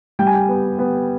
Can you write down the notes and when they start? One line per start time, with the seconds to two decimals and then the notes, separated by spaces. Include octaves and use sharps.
0.19 G3 G5
0.27 G#5
0.34 G5
0.49 B3
0.79 B3